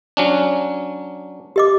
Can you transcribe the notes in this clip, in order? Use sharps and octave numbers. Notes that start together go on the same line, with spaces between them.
F#3 C#4 D4
G4 D#5 D6